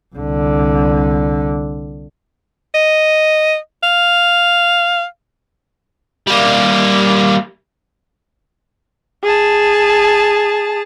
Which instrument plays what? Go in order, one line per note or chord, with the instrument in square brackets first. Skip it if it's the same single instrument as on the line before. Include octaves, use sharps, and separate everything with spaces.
[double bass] C2 D3
[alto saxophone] D#5
F5
[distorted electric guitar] G3 A#3
[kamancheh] G#4 A5